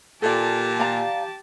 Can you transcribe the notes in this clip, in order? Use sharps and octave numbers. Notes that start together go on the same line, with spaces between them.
A#2 G4 A4 D5 A5
D5 F5 A#5